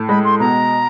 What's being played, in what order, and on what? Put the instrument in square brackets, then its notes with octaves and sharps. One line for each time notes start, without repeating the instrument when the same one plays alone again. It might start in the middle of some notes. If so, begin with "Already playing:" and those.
Already playing: [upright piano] A2
[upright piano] G#3 [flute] B5
[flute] C6
[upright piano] B2 [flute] A#5